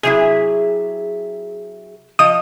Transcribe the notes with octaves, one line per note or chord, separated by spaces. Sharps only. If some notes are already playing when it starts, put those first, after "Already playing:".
C3 F#3 E4 G#4
F3 D#5 D#6